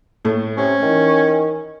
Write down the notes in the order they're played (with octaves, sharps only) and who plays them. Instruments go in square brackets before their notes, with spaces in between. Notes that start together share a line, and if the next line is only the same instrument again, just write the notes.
[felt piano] A2 A3
[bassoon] C3 [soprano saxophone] C#4
[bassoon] D#3 [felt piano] E3